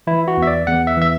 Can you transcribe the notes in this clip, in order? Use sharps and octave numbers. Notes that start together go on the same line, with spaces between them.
E3 E4
F#4
E2
E5
D5
E2 F#5
E5
E3 E5